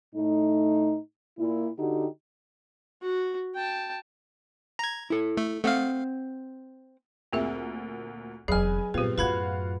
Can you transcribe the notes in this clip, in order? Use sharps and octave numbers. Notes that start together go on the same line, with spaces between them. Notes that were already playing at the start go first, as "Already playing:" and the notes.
A2 A3 D#4
A#2 E4
D3 D#4 F#4 G4
F#4
G5 A5
A#5 G#6
E4 A4
A3
A3 C4 F5 F#5
D2 A#2 A#3 C4 G#4 E5
F1 E2 F#3 G#4 B4 D#5 G#5 F6
G2 A#2 B3 C4 F4 G4 B4
F#2 A2 F4 F#4 B4 B5 G#6